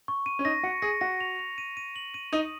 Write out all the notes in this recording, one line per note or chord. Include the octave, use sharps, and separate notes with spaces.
C#6
D#7
C#4
D#4 A#6
F#4 C#7
G#4 A#6
F#4 A#6
F7
F7
D#7
D#7
F#7
D#7
D#4 D#6